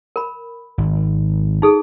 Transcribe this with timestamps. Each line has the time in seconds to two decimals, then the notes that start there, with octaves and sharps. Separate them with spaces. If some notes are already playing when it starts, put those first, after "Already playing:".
0.16 A#4 B5
0.78 G#1
1.62 D#4 G#4 A4